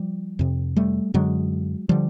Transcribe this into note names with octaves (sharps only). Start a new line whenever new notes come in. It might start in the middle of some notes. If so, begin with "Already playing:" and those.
Already playing: F3 G3
F2 C3
G3 A3
F#2 D3 F#3 G#3
D3 F3 G3